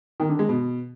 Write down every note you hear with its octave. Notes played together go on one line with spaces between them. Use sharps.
D#3
D3
G#3
B2